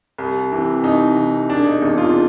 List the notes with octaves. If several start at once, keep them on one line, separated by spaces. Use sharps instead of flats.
C2
C3 E3
C2 D#4
C3 E3
E1 D4
D#4
E2 C3 D#4
F4